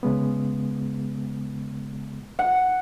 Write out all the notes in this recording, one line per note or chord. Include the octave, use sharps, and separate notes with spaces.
C#3 G#3 B3
F#5